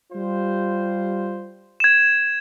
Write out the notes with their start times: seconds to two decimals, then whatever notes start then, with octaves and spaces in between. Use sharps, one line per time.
0.13 G3 F4 C5
1.80 G#6 E7